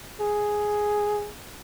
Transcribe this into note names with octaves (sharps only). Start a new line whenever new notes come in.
G#4